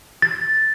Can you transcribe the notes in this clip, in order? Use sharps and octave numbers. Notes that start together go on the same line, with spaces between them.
A6